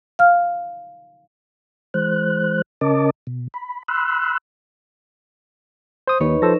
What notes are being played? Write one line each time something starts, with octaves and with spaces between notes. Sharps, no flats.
F5 F6
E3 G#3 C5 F#6
C#3 C#4 A#4 D#5 A5 D6
B2
B5
B5 C6 E6 F#6
C5 D#6
D#2 D#4 B4 C#5
F3 A4 C5 E6 A#6